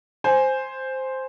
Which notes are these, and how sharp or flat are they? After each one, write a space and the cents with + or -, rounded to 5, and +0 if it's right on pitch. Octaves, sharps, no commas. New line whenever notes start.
C5 +0 G#5 +0